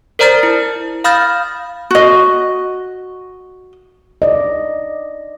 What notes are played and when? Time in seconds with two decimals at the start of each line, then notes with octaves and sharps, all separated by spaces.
0.19 A#4 C5 D5 A#5 F6 A6
0.43 E4
1.04 F5 B5 D#6 F6 G6 A6
1.91 F#4 D#5
4.22 D5 D#5